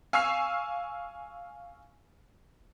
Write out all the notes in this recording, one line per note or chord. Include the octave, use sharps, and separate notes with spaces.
F5 G#5 C#6 E6 F6 C7